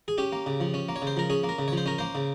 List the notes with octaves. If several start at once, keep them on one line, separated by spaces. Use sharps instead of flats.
G#4
C#4 G4
A#3
C#3
F3
C#4
A#3
C#5
C#3
C5
F3 A#4
C#4 G#4
A#3
A#4
C#3
F3 C#5
C5
C#4 A#4
A#3 C5
C#3